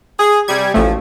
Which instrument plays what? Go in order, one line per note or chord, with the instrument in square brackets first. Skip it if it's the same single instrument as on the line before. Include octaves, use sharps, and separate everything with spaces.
[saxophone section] G#4
[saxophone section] C3 G3 [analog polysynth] G#6
[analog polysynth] A1 A3 [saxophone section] F3